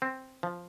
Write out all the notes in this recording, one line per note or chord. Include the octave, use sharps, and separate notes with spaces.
C4
F3